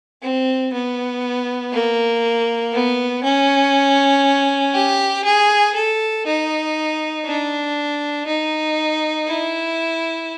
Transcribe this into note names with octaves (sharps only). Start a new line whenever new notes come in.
C4
B3
A#3
B3
C#4
G4
G#4
A4
D#4
D4
D#4
E4